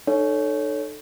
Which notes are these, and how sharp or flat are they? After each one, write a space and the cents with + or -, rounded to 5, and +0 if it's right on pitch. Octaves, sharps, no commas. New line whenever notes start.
D#4 -40 A4 +0 C#5 +0